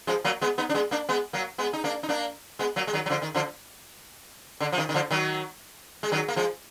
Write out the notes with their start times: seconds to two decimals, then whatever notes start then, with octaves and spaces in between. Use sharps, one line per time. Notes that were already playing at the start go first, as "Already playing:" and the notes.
0.07 F3 G#3
0.24 F#3 A#3
0.41 G#3 B3
0.58 B3 D#4
0.69 D4
0.74 G#3 B3
0.91 A#3 D4
1.09 G#3 B3
1.33 F#3 A#3
1.58 G#3 B3
1.73 D#4
1.84 A#3 D4
2.03 D#4
2.09 A#3 D4
2.59 G#3 B3
2.76 F#3 A#3
2.87 G#3
2.93 D#3 F#3
3.06 F#3
3.10 D3 F3
3.22 D#3
3.35 D3 F3
4.60 D3
4.72 F3
4.78 D#3
4.89 D#3
4.94 D3 F3
5.11 D#3 F#3
6.03 G#3
6.12 D#3 F#3
6.28 A#3
6.36 F3 G#3